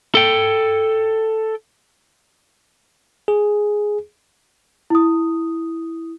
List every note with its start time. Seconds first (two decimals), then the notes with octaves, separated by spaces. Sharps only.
0.15 A4 G5
3.28 G#4
4.90 E4 D#6